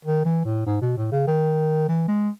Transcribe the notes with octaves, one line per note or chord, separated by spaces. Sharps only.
D#3
E3
A2
G#2
B2
A2
C#3
D#3
E3
G#3